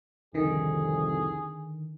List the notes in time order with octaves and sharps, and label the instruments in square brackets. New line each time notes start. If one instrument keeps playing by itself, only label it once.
[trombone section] C2 F2 [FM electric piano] D3 D#3 [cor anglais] G#4